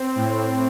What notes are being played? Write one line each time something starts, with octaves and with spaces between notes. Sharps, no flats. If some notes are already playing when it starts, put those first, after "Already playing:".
Already playing: C4
A2